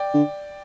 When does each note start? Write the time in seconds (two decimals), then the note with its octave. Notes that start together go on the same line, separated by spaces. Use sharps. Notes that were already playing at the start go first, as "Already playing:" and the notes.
Already playing: D5 G5
0.14 D3